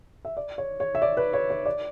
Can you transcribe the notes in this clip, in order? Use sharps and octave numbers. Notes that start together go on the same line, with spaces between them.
E5
D5
C#5
C#5
E5
D5
B4
C#5
C#5
D5